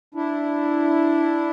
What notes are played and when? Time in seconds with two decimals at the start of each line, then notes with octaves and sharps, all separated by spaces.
0.14 D4 E4